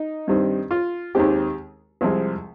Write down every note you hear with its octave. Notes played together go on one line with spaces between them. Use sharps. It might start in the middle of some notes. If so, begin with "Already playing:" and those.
Already playing: D#4
G2 D#3 G3 C4
F4
D#2 D#3 G#3 C4 G4
C2 C3 F3 G#3 C4